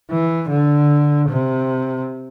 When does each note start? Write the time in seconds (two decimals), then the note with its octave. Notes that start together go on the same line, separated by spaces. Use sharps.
0.10 E3
0.50 D3
1.29 C3